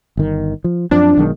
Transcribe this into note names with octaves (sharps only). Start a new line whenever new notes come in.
G1 D#3
F3
F#2 F3 C4 D4
B1 D#3 G#3